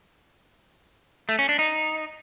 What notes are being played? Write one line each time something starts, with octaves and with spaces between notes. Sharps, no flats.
A3
C#4
D4
D#4